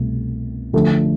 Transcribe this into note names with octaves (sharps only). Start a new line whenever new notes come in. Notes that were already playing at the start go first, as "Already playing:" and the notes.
Already playing: C2 B2 A3
D3 F3 A3 D4 A4